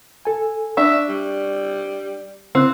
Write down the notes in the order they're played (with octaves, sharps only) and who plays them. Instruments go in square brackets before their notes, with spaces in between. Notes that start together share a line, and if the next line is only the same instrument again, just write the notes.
[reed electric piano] A4 G#5
[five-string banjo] D4 [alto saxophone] E5 [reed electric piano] C#6
[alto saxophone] G3
[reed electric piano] C#3 E4 F#6 [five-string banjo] C4